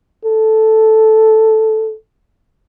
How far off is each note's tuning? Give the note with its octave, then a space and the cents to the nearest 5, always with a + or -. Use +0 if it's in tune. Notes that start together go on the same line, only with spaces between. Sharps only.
A4 +0